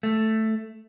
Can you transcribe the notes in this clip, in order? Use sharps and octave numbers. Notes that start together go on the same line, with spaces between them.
A3